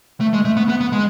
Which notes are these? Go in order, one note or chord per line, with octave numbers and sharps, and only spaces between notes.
A3
G#3
A3
B3
B3
B3
G#3